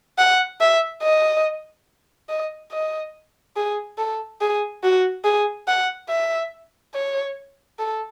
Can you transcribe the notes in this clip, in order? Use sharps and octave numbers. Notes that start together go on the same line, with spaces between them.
F#5
E5
D#5
D#5
D#5
G#4
A4
G#4
F#4
G#4
F#5
E5
C#5
A4